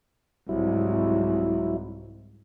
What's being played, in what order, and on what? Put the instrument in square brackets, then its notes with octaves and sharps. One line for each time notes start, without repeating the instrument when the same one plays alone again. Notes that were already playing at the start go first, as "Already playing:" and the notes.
[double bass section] C2 G#2 [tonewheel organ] F#3 E4